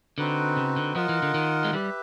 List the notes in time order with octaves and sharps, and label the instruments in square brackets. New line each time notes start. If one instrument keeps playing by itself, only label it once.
[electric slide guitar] D3 [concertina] C4 D#4 F#4 B4
[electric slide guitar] C#3
D3
[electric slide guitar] F3 [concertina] F4 A#4 D#5 F#5
[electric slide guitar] E3
D3
D#3
G#3
[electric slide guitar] G3 [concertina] G4 B4 E5